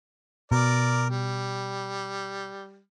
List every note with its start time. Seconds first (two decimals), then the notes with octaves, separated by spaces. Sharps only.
0.52 B2 A#4 D5
1.10 G3